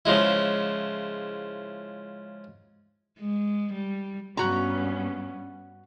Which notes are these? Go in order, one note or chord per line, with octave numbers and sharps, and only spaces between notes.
C#3 F3 G#3 E4
G#3
G3
G2 B3 C#4 F#4 A#5